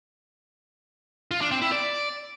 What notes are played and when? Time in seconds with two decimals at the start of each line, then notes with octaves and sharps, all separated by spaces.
1.31 F4
1.41 D4
1.52 C4
1.62 E4
1.72 D5